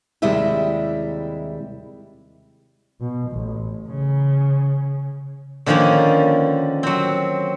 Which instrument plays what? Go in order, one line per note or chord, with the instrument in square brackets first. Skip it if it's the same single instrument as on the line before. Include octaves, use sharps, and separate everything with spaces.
[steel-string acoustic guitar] D#2 C3 G3 G#3 E4 E5
[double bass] B2
A1
C#3
[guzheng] D3 D#3 F3 A#3 C#4
F#3 C4